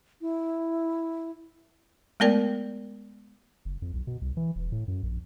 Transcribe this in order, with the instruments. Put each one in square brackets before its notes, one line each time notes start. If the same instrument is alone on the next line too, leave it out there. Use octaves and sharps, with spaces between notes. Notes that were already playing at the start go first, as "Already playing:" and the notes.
[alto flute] E4
[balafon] G#3 A3 B3 A#4 D5 G5
[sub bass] F#1
F2
B1
B2
C2
E3
E1
A2
F#2
A#1